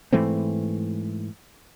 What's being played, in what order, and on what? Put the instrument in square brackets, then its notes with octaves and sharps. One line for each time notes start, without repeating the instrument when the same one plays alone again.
[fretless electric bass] G#2 E3 A3 C4